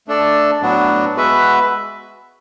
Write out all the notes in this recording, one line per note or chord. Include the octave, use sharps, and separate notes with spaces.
A3 D4 A4 D5
A2 F#3 B3 D4 F#4
G#3 B3 F#4 B4 E5